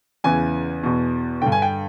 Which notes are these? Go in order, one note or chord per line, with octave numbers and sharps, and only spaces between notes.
E2 C#3 E3 G#5
E2 B2
G2 D3 G5
G#5
G5